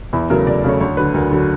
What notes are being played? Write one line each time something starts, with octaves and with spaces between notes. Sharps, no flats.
E2 E4
C#3 F#3 A3 A#4
E2 D5
C#3 F#3 A3 C#5
D2 C#5
D3 F#3 B4
D2 A#4
D3 F#3